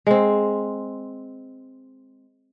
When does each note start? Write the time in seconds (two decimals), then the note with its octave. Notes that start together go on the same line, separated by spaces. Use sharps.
0.07 G#3 C4